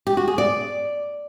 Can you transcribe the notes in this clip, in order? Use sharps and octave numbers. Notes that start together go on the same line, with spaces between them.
G4
F#4
G#4
D5